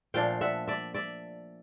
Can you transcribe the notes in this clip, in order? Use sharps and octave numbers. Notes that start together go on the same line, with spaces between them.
A#2 F3 A3 D4 F5 G5
E5 F#5
D5 E5
D5 E5